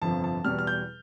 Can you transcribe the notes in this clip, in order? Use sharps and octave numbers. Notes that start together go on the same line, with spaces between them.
G1 F2 C3 F3 A5
A5
E2 B2 G3 F6
F6
G6